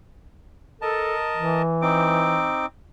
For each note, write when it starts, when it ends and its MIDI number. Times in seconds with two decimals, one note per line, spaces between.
0.82 1.15 69
0.82 1.62 70
0.82 1.62 75
0.82 1.62 81
1.36 2.53 52
1.82 2.66 60
1.82 2.66 63
1.82 2.66 86